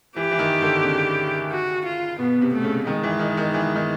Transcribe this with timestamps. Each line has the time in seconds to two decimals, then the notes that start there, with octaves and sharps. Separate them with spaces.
0.16 E3 G4
0.31 E3
0.39 D#3
0.62 D3
0.84 C#3
1.51 F#4
1.85 F4
2.19 B2 B3
2.41 C3
2.53 A3
2.64 C#3
2.86 D#3 G#3
3.03 E3
3.19 D#3
3.37 D#3
3.54 E3
3.75 D#3